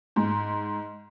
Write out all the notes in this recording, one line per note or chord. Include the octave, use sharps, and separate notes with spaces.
G#2